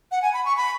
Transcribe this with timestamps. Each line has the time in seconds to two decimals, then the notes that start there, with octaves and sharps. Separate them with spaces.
0.11 F#5
0.22 G#5
0.34 B5
0.45 C#6
0.57 B5